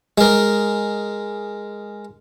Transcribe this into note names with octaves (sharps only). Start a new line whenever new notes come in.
G#3 A#4